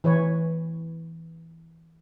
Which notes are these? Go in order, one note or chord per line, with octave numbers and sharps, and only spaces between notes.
E3 B4 C#5